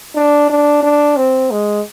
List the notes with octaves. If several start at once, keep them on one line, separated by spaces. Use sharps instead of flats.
D4
D4
D4
C4
G#3